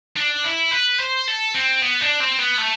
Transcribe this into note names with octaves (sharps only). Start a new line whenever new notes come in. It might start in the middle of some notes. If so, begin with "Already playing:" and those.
D4
E4
B4
C5
A4
C4
B3
D4
C4
B3
A3